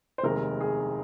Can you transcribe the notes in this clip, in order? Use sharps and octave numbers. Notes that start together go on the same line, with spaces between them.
C5
F1 D#2 D#3 G#3 A#4
G#4